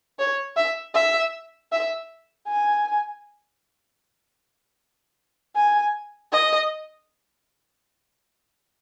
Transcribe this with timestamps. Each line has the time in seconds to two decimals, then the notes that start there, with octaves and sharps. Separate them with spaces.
0.19 C#5
0.56 E5
0.94 E5
1.72 E5
2.48 G#5
5.56 G#5
6.32 D#5